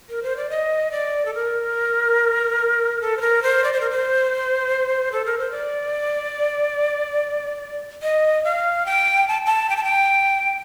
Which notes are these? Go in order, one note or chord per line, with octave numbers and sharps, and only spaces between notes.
A#4
C5
D5
D#5
D5
A4
A#4
A4
C5
A#4
C5
D5
C5
A#4
C5
A4
A#4
C5
D5
D#5
F5
G5
A5
A5
G5
A5
G5